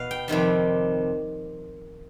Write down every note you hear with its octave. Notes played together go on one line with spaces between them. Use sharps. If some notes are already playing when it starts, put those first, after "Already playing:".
Already playing: B2 B3 F5
G5
F2 C3 D#3 G3